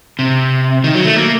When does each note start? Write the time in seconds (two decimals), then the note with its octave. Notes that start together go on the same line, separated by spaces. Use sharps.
0.19 C3
0.84 D#3
0.95 F#3
1.05 A3
1.16 A#3